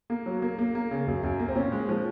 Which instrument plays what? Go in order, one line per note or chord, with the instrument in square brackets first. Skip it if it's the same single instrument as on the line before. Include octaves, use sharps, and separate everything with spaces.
[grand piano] A#3
F#3
A#3
A#3
A#3
C#3
F#2
F#2
A#3
C4
A#2 C#4
G#3
F3